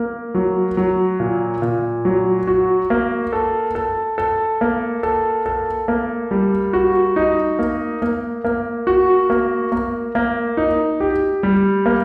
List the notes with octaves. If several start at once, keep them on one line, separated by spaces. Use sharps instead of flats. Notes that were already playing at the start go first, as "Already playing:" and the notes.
Already playing: A#3
F#3
F#3
A#2
A#2
F#3
F#4
A#3
A4
A4
A4
A#3
A4
A4
A#3
G3
F#4
D#4
A#3
A#3
A#3
F#4
A#3
A#3
A#3
D#4
G4
G3
A#3